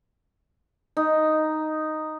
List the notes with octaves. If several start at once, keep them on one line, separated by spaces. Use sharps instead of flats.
D#4